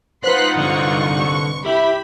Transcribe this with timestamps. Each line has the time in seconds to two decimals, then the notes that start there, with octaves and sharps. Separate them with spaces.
0.24 D#4 F4 B4 C5 F#5 C6 F#6 B6
0.57 C2 G2 D3 C#6
1.66 E4 G4 B5